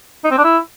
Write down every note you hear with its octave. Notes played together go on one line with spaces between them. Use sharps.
D#4
C4
D4
E4